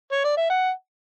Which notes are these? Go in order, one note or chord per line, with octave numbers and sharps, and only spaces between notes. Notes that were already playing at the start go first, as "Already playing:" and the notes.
C#5
D5
E5
F#5